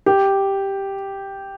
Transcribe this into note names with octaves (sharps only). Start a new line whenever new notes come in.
G4